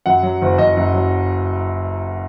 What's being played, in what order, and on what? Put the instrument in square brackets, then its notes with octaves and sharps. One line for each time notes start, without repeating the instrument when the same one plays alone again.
[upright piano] F#2 F#5
F#3
F#1
F#1 D#5
F#2
F#3